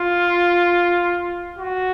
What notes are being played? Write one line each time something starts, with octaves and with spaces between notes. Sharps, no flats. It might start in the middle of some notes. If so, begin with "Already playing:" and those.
Already playing: F4
F#4